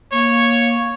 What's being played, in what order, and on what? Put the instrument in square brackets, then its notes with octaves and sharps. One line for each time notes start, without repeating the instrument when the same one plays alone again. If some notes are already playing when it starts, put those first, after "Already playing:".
[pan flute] A#3 [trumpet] C#5